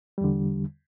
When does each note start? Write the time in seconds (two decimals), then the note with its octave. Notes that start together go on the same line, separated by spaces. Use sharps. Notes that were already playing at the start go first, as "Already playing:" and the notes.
0.18 G3
0.21 E2
0.24 D3